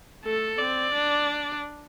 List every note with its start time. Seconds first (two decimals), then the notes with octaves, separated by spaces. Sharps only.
0.24 A3 A4
0.58 C4 D5
0.93 D4